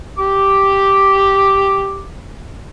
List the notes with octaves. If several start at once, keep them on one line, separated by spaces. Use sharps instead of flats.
G4 D6